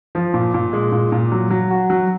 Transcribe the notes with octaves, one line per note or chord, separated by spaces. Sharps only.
F3
A#2
A#2
G#3
A#2
A#2
F#3
F#3
F#4
F#3